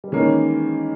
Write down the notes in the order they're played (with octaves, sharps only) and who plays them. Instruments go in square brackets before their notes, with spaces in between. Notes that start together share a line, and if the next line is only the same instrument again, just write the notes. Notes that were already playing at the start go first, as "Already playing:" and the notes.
[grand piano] G3
[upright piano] D#3 A#3 C#4 [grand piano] E3 G#3